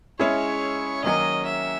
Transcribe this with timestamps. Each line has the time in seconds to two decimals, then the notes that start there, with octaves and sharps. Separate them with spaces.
0.19 G#3 C#4 E4 G#4 C#5
1.04 D#3 F#3 A#3 C#4 D#5
1.46 E5